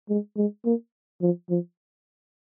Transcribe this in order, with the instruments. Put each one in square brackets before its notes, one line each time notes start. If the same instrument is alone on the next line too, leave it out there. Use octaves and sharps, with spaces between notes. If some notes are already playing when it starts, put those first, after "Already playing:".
[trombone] G#3
G#3
A#3
F3
F3